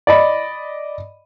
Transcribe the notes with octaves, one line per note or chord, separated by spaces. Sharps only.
D5 D#5 B5